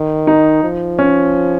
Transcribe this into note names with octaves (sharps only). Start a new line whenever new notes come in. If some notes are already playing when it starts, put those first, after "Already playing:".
Already playing: D#3
D#4
F3
C#4